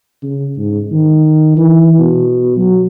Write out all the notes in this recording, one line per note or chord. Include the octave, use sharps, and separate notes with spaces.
C#3
G#2
D#3
E3
B2
F#3